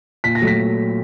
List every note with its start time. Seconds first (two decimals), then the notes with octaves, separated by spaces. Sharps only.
0.24 A#2 B6
0.35 A#6
0.41 F#3 A3
0.47 B6